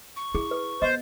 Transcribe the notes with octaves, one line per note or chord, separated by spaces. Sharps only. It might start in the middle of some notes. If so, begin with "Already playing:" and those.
C#6
E4 G#4
B4
B3 C5 D#5